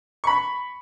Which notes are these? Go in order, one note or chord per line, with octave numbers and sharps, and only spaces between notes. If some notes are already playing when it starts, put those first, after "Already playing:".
B5 C#6